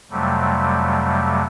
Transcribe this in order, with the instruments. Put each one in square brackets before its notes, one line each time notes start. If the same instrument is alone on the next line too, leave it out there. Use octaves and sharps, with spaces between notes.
[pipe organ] F2 C3 F#3 G3 A3